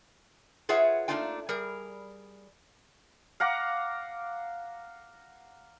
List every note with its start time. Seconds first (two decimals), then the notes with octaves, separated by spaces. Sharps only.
0.69 F4 G#4 B4 C#5 E5 F#5
1.08 A3 A#3 D4 D#4 F4 G5
1.49 G3 G#4 A#4
3.40 F5 F#5 A#5 D6